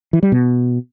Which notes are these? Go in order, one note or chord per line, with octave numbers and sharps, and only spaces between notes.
E3
G3
B2